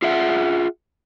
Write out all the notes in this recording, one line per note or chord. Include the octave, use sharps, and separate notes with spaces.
F4 G#4 E5 F#5